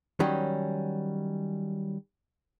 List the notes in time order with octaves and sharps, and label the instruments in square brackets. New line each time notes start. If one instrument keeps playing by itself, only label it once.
[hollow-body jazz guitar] D#3 F#3 G3 C#4